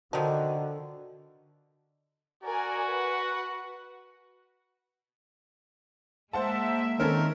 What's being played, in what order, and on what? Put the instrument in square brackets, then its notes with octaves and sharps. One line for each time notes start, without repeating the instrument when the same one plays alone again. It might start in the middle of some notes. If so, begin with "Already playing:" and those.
[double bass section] D3 [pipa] D#3 F3 [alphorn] F#4
[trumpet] F#4 [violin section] A#4 D5 G#5
[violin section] B4 F#5
[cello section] G#3 A#3 E5 [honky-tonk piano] C5 F#5 A5
[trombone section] D#3 [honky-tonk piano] C4 C#4 A4 [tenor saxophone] A#4